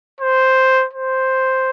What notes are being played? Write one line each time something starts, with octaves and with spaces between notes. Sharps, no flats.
C5
C5